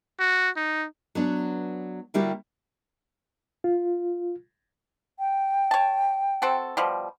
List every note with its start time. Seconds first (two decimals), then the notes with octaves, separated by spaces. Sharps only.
0.20 F#4
0.56 D#4
1.15 F#3 B3 D4
2.14 D3 G3 A#3 E4 F#4 G4
3.64 F4
5.19 G5
5.71 C#5 A5
6.42 C4 F#4 A4
6.77 B2 F3 G3